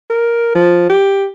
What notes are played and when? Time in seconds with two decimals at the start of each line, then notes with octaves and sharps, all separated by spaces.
0.10 A#4
0.55 F3
0.89 G4